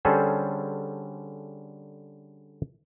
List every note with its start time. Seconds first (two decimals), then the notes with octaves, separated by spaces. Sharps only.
0.05 D3 G3 C#4 G#4 A4 C5